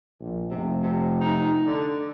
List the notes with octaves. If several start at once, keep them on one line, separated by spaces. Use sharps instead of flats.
A#1
F1 C3
C3
D#4
D3